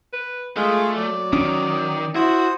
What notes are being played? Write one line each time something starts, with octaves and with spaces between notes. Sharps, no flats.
B4
G#3 A3 F4 G#4 F5
F#3 D5
D#3 C#4
E4 F#4 C5 D#6